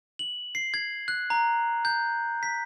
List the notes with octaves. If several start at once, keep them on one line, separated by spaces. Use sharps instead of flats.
F#7
C7
G#6
F#6
A#5
G6
B6